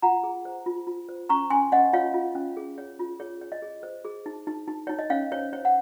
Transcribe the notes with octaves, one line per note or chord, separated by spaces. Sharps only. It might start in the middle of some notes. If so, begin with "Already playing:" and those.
F4 F#5 A#5
G#4
C5
F4
F4
C5
C#4 A#5 C#6
C#4 G#5 C6
C#4 D#5 F#5
F4 C#5 F5
F4
C#4
G#4
C#5
F4
G#4 C#5
C#5
D#5
G#4
C5
G#4
D#4
D#4
D#4
D#4 C#5
D#5
C#4 C#5 F5
C5 C#5
C5 C#5
F#5